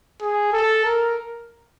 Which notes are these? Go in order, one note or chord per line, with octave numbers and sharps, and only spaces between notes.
G#4
A4
A#4